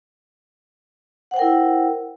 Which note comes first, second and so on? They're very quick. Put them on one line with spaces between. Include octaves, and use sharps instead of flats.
F#5 C5 G5 A#4 E4